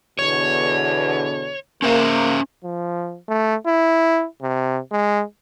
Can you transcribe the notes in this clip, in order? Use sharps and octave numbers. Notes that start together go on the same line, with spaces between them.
E2 B2 D3 C#5
A#3 C#4 C5 E5
F3
A3
E4
C3
G#3